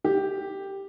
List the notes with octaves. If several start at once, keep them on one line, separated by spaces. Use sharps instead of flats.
G4